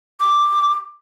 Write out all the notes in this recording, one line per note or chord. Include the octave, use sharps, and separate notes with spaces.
D6